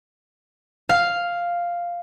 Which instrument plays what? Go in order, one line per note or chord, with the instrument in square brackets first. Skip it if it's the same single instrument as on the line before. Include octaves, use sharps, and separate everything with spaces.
[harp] F5